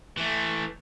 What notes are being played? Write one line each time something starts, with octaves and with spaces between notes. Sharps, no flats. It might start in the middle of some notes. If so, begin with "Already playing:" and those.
E3 A3